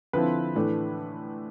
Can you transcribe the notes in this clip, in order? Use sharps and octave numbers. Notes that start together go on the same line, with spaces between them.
D3 F3 C4 E4 B4
A2 E3 A3 D4